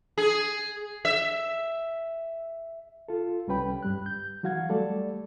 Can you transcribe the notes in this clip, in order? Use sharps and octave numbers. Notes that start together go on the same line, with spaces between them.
G#4
E5
F4 A4
C2 G3 C#4 B4 G5 B5
G2 G3 F#6
G6
E3 F#3 F#4 F5 F#5 G#6
G3 A3 A4 D5